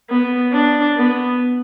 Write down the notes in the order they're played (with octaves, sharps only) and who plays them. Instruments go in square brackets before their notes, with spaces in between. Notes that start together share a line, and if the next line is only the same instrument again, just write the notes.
[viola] B3
D4
B3